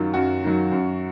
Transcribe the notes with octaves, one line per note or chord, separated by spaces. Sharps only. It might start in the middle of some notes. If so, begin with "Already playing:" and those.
Already playing: F#2 D#3 F#3 F4
F#2 F#4
D#3 F#3
F#2